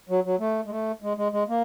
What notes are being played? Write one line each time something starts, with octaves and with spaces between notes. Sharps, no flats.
F#3
F#3
A3
G#3
A3
G#3
G#3
G#3
A#3